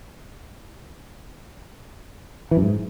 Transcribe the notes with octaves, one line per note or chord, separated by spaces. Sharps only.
E3
F#2
G#2